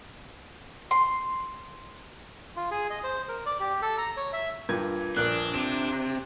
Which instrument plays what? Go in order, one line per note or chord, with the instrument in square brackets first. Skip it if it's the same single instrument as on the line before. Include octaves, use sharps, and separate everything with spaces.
[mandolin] C6
[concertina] F4
G#4
D#5
C5
A#4
D5
G4
A4
A#5
C#5
E5
[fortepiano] G2 A#2 [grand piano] G#6
[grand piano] A#1 A#4 F#6 [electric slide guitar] D4
[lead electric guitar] C3 [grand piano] E7